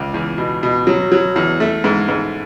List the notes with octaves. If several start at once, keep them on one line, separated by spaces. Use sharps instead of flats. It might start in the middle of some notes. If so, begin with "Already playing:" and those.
Already playing: C#2
E2
B2
B2
F#3
F#3
E2
A3
G#2
G#2